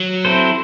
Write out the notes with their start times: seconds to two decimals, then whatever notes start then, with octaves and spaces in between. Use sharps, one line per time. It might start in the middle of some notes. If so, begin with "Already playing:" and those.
Already playing: F#3
0.25 C4 E4 A4 C5